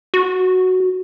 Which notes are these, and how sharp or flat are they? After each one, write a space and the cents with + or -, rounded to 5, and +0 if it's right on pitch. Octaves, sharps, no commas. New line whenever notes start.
F#4 +0